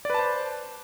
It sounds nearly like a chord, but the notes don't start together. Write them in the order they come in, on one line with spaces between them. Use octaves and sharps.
D5 B4 A5 C5